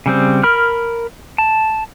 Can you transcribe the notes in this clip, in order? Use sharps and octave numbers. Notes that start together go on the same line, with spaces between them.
C#3 G3 C4
A#4 B5 F6
A5